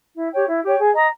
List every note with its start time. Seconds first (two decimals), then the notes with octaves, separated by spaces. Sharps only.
0.15 E4
0.31 G4 C#5 G5
0.47 E4
0.63 G4 C#5 G5
0.78 G#4
0.94 D#5 A#5